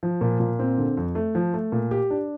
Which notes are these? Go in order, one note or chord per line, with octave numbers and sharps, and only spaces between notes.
F3
A#2
A#2
C4
D3
F2
A3
F3
A3
A#2
G4
D4